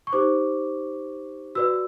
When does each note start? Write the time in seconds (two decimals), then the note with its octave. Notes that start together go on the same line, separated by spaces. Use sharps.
0.07 C#6
0.13 D#4 G4 C5 D6
1.55 F#4 B4 D5 E6